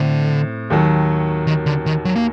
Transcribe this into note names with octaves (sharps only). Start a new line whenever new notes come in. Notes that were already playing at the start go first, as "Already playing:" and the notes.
Already playing: A2 D3 C4
D#2 D#3 F#3
D#3
D3
D#3
F#3
A#3